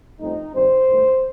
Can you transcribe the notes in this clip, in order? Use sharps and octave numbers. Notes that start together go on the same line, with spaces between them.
G2 F3 A3 C4 D#4
G2 D#3 G3 C4 C5
G2 D#3 A3